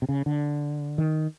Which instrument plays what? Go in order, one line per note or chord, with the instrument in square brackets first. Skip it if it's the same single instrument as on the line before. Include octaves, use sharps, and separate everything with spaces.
[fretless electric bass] C3
C#3
D3
D#3